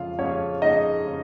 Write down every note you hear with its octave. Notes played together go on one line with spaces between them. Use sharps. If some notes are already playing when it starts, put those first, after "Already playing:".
Already playing: F2 C#3 G#3 F4 F5
F2 C#3 G#3 C#4 C#5
F2 C#3 G#3 D#4 D#5
C#3 G#3